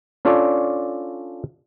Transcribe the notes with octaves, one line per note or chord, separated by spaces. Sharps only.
C#4 D4 F4 A4 C#5 D5